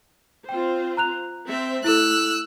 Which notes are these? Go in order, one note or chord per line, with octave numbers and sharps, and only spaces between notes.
C4 F4 C5 G5
A#5 F#6 F7
C4 E5
A3 E4 A4 E6 F#6